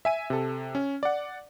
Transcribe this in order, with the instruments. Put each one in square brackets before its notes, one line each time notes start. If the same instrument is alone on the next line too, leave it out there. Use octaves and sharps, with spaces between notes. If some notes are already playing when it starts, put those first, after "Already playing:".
[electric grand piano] E5 G#5 D#7
C3 A4
C#4
D5 F#5